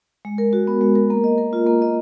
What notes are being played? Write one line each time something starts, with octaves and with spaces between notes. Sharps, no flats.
G#3
A#4
F#4
B3
G#3
A#4
A#3
D#5
A#4
F4
A#3
D#5